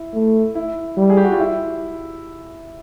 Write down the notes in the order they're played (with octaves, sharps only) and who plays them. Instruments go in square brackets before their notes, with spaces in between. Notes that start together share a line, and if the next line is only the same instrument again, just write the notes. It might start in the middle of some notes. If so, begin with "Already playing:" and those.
Already playing: [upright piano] E4
[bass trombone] A3
[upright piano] E4
[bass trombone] G3
[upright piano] G#4
G4
F#4
F4
E4